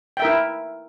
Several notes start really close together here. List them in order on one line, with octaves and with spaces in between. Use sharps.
G5 E5 A#4 E4